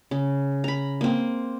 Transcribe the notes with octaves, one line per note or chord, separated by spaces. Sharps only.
C#3
A#5 B5
A#3 C4